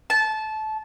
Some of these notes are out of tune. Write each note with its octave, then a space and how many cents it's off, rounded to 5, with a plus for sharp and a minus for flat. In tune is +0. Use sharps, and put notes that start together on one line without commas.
A5 -20